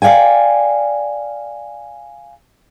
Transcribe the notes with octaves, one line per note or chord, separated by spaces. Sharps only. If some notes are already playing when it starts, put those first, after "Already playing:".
D5 F5 G5 G#5